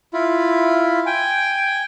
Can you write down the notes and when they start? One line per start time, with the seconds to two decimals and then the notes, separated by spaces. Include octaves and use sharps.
0.14 E4 F4
1.06 G5 G#5